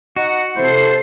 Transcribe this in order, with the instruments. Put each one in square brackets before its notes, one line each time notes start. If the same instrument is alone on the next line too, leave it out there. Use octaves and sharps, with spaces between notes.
[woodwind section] D#4 D#5 F#5 [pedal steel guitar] F#4
[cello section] C3 A4 [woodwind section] E4 C5 [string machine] C7